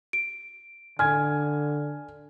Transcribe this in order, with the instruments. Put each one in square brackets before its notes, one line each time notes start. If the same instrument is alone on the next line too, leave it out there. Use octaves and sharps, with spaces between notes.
[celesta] D7
[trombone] D3 [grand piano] G#5 G#6 [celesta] F6